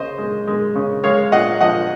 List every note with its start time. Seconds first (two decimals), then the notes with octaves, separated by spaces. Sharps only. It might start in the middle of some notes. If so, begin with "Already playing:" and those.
Already playing: C#3 C5 D#5
0.18 G#3
0.47 G#3
0.75 C#3
1.04 G#3 C#5 F5
1.32 A#2 D#5 F#5
1.61 F3 D#5 F#5